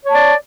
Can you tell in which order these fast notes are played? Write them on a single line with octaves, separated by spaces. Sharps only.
C#5 A5 D5